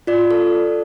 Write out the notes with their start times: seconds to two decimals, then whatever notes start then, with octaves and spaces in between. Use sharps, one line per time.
0.07 F4 D5
0.31 A4